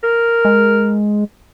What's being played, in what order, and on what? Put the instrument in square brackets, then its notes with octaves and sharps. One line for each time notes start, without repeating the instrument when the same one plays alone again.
[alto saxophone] A#4
[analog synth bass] G#3